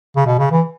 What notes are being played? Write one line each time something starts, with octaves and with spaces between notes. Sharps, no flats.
C#3
B2
C#3
E3